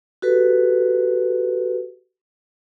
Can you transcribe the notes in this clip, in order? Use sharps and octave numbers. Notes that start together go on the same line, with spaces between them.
F#4 G4 A4 B4